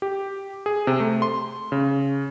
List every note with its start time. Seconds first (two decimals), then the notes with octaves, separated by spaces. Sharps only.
0.02 G4
0.66 G#4
0.87 C3
1.00 A3
1.22 C6
1.72 C#3